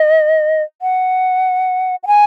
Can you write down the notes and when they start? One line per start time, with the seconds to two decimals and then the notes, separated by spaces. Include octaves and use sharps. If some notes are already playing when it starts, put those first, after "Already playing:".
Already playing: D#5
0.82 F#5
2.03 F#5
2.07 G#5